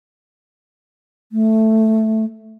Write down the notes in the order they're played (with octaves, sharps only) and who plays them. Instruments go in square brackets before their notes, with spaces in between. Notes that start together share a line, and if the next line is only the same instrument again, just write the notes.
[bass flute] A3